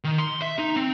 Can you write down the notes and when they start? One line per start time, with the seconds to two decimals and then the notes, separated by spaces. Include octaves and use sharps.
0.04 D#3
0.18 C6
0.42 E5
0.58 D#4
0.76 C4